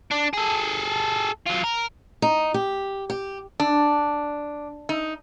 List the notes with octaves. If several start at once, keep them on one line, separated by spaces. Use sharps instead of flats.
D4
G#4 A4
F#3 F4
A#4
D#4
G4
G4
D4
D#4